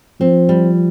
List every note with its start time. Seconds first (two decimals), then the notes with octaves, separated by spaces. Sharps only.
0.20 F3 C4
0.49 G3